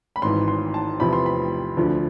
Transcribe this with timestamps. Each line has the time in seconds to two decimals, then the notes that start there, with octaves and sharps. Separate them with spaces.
0.16 B5
0.22 G#1 G#2 E3 C6
0.48 C6
0.74 A5
1.00 E2 C3 F3 B5
1.13 C6
1.26 B5
1.77 D2 D3 F3